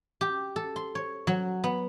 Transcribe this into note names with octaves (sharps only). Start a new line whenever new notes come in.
G4
A4
C6
C#5
F#3
B3